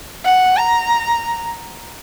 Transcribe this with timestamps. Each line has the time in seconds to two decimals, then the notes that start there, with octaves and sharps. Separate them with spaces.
0.25 F#5
0.56 A#5